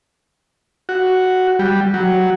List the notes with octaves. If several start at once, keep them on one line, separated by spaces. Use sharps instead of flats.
F#4
G3
F#3